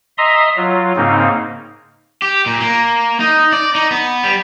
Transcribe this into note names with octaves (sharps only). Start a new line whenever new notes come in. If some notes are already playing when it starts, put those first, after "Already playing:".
D#5 E5 A#5 C6 D#6
F#3 F4
G#2 C#3 A#3 C4 D#4
G4
A#2
A#3
D#4
D5
D#4
B3
G3